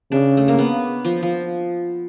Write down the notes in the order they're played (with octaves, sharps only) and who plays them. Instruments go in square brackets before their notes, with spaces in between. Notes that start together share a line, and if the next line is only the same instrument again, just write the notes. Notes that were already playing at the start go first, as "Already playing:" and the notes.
[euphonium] C#3 [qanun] D4
[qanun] A3
A#3
B3
F3
F3